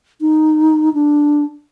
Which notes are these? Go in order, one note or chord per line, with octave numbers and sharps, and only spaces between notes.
D#4
D4